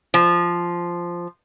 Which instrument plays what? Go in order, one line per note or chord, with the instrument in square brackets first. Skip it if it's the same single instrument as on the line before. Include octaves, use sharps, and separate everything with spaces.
[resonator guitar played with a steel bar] F3